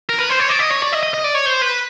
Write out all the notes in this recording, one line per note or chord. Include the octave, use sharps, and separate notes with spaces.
A#4
B4
C5
C#5
D5
D#5
C#5
D5
D#5
D#5
D#5
D5
C#5
C5
B4